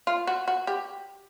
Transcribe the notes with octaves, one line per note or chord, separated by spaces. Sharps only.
F4
F#4
F#4
G4